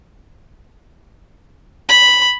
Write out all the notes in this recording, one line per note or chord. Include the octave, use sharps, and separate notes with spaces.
B5